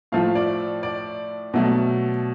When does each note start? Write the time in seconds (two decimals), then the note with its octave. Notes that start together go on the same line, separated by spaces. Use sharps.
0.12 A2 F3 A3 F5
0.35 D5
0.83 D5
1.54 B2 F#3 A3